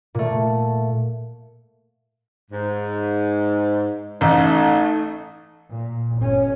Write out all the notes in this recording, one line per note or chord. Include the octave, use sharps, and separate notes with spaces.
A#2 A3
G#2
A1 A3 D#4
A#2
G1 C#4